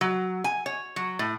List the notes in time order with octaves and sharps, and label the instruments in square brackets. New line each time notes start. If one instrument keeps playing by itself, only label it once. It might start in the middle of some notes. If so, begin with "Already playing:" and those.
[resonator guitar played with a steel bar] F#3
G#5
C#5
F#3
A2